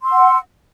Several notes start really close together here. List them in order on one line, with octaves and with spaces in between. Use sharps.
C6 E6 F#5